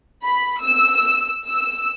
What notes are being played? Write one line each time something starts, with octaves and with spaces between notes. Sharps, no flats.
B5
E6
E6